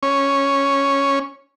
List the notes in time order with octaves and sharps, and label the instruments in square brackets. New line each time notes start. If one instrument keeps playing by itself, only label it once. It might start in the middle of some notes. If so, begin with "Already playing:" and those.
[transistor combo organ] C#4